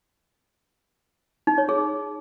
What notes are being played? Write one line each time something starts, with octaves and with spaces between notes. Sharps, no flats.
D#4
C#5
G#4